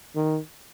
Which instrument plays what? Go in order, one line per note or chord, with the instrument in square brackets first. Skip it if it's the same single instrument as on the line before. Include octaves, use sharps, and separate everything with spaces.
[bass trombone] D#3